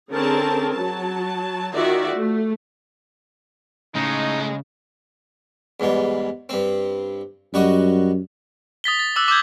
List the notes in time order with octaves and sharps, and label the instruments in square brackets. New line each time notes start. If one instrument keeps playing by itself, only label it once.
[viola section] D3 C4 C#4 G#4 A#4 A5
F#3 A5
D#3 F4 F#4 D5 E5
A3
[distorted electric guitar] A2 [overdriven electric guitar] C#3 [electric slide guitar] G#3 [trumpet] D#4
[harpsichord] E2 G#2 G3
G2 C4
[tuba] F#2 [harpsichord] G3 F#4 D#5
[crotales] D#6 A6 B6 G7
A6
D6 E6 F#6
D6 E6 G6 G#6